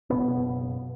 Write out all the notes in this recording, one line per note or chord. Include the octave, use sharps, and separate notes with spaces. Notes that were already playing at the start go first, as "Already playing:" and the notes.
F#1 B2 B3